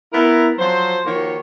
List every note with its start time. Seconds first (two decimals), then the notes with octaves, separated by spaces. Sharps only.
0.13 B3 E4 A#4
0.59 F3 F#3 C5
1.05 D#3 F3 A#3 F#4 C#5